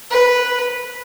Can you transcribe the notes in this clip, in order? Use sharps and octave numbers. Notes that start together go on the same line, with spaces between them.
B4